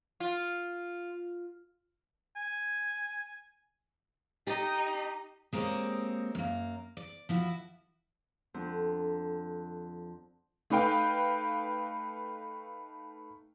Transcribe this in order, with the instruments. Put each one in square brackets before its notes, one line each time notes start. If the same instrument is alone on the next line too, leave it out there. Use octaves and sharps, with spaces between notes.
[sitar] F4
[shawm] G#5
[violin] D#4 [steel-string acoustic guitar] G4
[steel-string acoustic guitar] G#3 A#3 C4 G4 C#5 D#5
F#2 A#3
D5
F3 E4 F#4
[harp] F2 [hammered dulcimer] D3 A#5
[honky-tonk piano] A3 D#4 B4 F5 G5